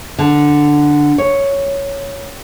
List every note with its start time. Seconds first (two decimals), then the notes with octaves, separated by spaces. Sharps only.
0.19 D3
1.18 C#5